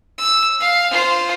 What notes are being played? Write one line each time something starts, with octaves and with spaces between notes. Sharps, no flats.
E6
F5
F4 C5